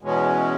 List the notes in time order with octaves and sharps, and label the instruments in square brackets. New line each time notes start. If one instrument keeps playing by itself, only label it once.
[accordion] E2 B2 G#3 C#4